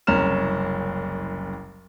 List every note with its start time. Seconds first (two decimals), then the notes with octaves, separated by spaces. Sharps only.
0.07 F#1 C2 C#4 A#5 F6 E7